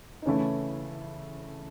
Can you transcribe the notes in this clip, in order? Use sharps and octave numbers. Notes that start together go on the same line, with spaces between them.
D#4
C#3 E3 A3 C#4 E4